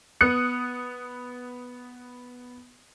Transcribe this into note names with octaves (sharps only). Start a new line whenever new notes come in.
B3 D#6 F#6 C#7